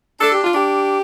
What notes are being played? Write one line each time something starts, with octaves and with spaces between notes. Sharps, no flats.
D4 A4
G4
F4
D4 G4